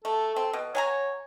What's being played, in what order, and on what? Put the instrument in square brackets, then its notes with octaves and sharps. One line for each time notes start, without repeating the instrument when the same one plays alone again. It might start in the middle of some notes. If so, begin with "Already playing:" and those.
[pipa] A3 [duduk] A4
[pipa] C4
B2
[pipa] F#3 G#5 A#5 [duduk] C#5